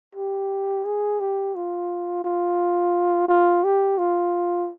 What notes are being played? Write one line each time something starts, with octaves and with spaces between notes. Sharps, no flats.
G4
G#4
G4
F4
F4
F4
G4
F4